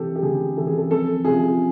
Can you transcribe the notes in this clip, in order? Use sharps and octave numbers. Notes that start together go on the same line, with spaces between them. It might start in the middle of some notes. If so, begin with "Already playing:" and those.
Already playing: C3 E3 G4 A4
G4
D2 G#4
C3 E3 A4
G#4
A4
F2 A4
C3 F3 G#4